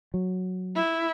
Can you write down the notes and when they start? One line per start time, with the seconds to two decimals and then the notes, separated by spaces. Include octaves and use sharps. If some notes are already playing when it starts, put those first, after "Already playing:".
0.14 F#3
0.75 E4